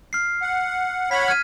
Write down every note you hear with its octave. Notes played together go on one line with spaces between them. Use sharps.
F6 C7
F#5
C#5 F#5 B5 B6
F6 G#6 D#7